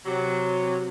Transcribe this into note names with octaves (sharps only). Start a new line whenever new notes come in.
C3 F#3